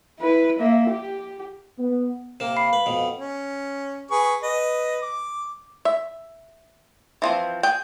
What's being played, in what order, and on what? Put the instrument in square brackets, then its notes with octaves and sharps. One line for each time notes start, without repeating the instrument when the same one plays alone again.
[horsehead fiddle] E4 B4
A#3 E5
G4
[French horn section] B3
[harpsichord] C3 A#3 [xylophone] E7
[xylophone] F5 B5 C7
[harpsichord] B4
F2 B2
[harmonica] C#4
G#4 B4 C#6
B4 D#5
D6
[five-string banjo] E5
E3 F3 C4
G#4 G5